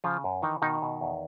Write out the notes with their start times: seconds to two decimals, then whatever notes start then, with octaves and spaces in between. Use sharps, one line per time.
0.04 C#3 F3 F4
0.24 F#2
0.42 D#3 E3 D#4
0.62 B2 D#3 D#4
0.82 B2
1.01 E2